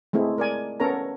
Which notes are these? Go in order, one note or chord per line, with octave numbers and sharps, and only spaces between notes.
G#3 A3 C4 E4
A#4 D5 G#5
B3 C#4 A4 A#4 C#5 A#5